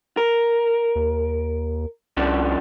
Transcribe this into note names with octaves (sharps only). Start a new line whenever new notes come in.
A#4
D#2
C2 F3 C#4 D4